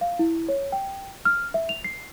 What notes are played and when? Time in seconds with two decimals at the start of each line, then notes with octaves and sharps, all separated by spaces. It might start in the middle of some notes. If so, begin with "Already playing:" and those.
0.01 F5
0.19 E4
0.49 C#5
0.72 G5
1.25 F6
1.54 E5
1.69 F7
1.84 C7